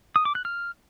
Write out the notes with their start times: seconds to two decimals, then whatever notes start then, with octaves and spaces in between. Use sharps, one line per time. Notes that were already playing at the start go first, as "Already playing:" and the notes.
0.16 D#6
0.25 D6
0.35 F#6
0.45 F6